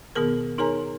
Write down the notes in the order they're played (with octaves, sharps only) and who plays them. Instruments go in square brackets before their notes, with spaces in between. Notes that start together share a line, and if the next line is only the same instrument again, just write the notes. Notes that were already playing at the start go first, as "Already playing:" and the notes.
[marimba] B2 D#3 B3 G#4 A#4
D#4 G#4 A#4 C#5 G#5 A#5